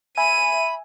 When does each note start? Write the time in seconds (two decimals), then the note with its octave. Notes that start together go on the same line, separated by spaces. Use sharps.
0.17 E5 G#5 B5 D#7